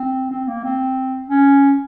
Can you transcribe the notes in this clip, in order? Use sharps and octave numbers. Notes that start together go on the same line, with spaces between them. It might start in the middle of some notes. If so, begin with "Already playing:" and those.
Already playing: C4
C4
A#3
C4
C#4